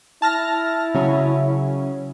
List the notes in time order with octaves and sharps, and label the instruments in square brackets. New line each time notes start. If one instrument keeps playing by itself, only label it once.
[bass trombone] E4 [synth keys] A5 F6 A#6
[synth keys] C#3 F#3 C#4